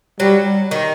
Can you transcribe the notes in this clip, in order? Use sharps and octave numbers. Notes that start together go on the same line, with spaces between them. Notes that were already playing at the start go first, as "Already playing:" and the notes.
F#3 G3
D#3